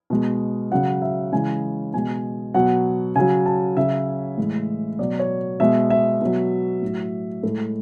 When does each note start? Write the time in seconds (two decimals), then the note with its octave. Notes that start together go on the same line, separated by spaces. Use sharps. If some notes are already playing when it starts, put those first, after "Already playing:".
0.10 B2 G#3
0.71 C#3 F#3 F#5
1.02 E5
1.33 C#3 E3 G#3 G#5
1.93 B2 G#3 G#5
2.54 B2 F#3 F#5
3.16 C#3 F#3 G#5
3.46 A5
3.77 C#3 F#3 E5
4.38 A2 E3 G#3
4.99 B2 F#3 D5
5.19 C#5
5.60 B2 G#3 E5
5.90 E5
6.21 B2 F#3
6.82 A2 F#3
7.43 A2 G#3 A4